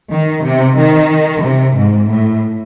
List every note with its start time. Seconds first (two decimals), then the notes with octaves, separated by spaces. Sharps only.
0.11 D#3
0.44 C3
0.77 D#3
1.43 C3
1.76 G#2
2.09 A2